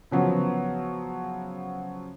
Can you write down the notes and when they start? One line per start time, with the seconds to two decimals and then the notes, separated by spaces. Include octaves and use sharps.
0.11 C#3 F3 F#3 B3